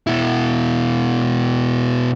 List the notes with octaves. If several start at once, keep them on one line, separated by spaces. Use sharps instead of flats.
B2 E4